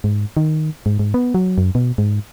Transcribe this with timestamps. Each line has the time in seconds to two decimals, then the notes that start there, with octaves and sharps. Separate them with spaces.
0.04 G#2
0.37 D#3
0.86 G#2
0.99 G#2
1.14 B3
1.34 F#3
1.58 F#2
1.75 B2
1.98 G#2